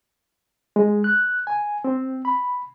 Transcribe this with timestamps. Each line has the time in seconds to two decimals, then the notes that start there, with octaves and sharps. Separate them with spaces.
0.76 G#3
1.04 F#6
1.47 G#5
1.84 C4
2.25 B5